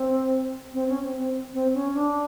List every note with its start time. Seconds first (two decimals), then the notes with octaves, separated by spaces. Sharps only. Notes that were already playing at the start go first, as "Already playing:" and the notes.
Already playing: C4
0.73 C4
0.88 C#4
1.04 C4
1.18 C4
1.54 C4
1.74 C#4
1.94 D4